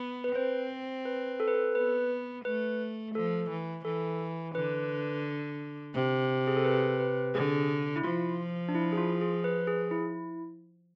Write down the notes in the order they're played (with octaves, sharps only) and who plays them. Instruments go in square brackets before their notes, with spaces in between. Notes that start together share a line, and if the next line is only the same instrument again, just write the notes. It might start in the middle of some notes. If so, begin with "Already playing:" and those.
Already playing: [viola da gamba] B3
[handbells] B4
[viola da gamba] C4 [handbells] C5
[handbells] B4
A4
B4
A4
[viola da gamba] B3 [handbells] B4
[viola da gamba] A3 [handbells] B4
[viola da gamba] F3 [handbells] A4
[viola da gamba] E3
[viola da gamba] E3 [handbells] A4
[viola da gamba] D3 [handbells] B4
[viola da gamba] C3
[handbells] G#4
A4
B4
B4
[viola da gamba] D3 [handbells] G#4
[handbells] E4
[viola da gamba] F3 [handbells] F4
[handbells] D4
E4
G#4
F4
G#4
B4
G#4
E4